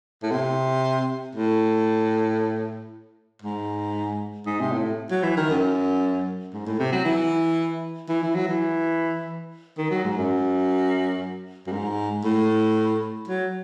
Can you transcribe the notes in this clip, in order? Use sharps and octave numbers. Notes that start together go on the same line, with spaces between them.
A2
C3
A2
G#2
G#2
C3
A2
F#3
E3
D#3
F#2
G#2
A2
C3
F#3
E3
E3
E3
F#3
E3
D#3
F#3
G#2
F#2
F#2
G#2
A2
F#3